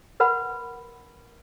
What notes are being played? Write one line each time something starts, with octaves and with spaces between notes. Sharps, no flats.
A#4 B4 F#5 B5 C6